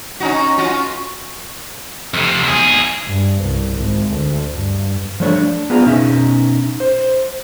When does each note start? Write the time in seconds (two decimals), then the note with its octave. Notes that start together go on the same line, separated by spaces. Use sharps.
0.20 C#4 D#4 F#4
0.58 C#4 F4 F#4
2.14 F2 C3
2.43 B1 G#4
3.05 G2
3.42 C2
3.73 G#1
4.12 D2
4.54 G2
5.20 F3 G3 A3 D4 C#5
5.34 D4
5.70 B3 F4 G#4 D5 A#5
5.86 B2 C#4 D#4 E5
6.80 C5